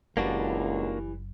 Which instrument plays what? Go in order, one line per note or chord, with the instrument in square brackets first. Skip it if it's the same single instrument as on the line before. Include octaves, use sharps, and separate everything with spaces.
[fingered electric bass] F#1 F#2 [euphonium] C#2 [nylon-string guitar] E3 G3 [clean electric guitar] A#3 D4 F#4